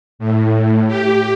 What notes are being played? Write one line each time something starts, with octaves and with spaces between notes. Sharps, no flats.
A2
G4